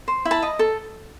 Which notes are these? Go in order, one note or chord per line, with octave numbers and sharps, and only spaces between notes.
C5
E4
A5 B5
D#5
A4